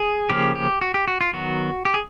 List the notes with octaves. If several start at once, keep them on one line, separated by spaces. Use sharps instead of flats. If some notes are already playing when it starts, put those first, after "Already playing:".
Already playing: G#4
C#3 F3 A#3 C#4 G4
G4
F#4
G4
F#4
F4
D#3 F#3 B3 F#4
G4
G#4